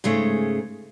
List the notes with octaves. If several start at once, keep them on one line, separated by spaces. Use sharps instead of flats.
G#2 C#3 G#3 A3